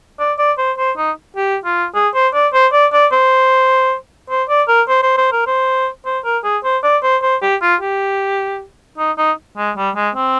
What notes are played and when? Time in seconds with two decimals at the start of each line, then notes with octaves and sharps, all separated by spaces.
0.19 D5
0.39 D5
0.58 C5
0.78 C5
0.97 D#4
1.37 G4
1.65 F4
1.95 G#4
2.14 C5
2.34 D5
2.53 C5
2.73 D5
2.93 D5
3.12 C5
4.30 C5
4.49 D5
4.68 A#4
4.89 C5
5.03 C5
5.17 C5
5.32 A#4
5.47 C5
6.05 C5
6.24 A#4
6.44 G#4
6.64 C5
6.84 D5
7.03 C5
7.22 C5
7.42 G4
7.62 F4
7.81 G4
8.98 D#4
9.18 D#4
9.58 G#3
9.77 G3
9.96 G#3
10.15 C4